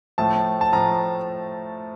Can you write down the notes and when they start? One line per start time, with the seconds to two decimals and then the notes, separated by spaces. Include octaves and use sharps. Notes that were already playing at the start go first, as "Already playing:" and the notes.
0.18 A2 F3 A3 A5
0.61 A5
0.73 A2 F3 A3 A#5